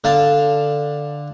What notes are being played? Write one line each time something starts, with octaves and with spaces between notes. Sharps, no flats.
D3 F5 A5